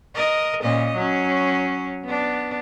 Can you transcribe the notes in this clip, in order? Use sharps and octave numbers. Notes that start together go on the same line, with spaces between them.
A#4 D#5
A#2 C#4 D#5
F#3 C#4
B3 D4